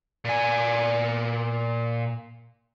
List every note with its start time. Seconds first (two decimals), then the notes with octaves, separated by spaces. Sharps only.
0.25 A#2 G#5